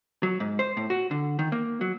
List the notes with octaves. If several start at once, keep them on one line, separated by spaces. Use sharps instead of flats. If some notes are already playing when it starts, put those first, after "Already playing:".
F#3
G#2
C5
A2
F#4
D3
D#3
A#3
F#3